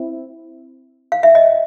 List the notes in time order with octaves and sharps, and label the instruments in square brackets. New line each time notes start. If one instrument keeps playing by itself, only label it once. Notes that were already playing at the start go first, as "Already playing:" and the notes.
Already playing: [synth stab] C4 E4
[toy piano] F5
E5
D#5